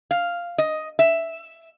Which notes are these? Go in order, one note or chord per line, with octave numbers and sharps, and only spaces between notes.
F5
D#5
E5